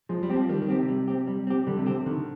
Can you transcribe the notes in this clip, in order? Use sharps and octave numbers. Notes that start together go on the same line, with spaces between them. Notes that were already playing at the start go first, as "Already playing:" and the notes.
F3 G#3
G3
C4 G4
F3
D#3 G3
D#3
C4 G4
C3
G3
C4 G4
G3
C4 G4
D3 G3
C3
D3 C4 G4
C3
D3 D#3